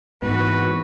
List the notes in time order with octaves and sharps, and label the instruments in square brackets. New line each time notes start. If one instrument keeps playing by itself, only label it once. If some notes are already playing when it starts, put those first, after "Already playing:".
[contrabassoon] G#1 [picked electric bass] G#2 B3 [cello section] E3 F#3 F#4 [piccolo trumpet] B4